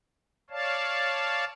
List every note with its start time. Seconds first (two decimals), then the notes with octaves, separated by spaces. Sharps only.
0.50 C#5 D5 F5 A5